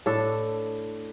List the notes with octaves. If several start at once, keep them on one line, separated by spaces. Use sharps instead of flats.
A2 D4 A4